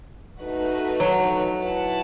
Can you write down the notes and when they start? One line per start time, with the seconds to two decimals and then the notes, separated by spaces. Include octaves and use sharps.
0.40 A3 D#4 F#4 B4
1.00 F#3
1.60 E4 B4 F#5 A5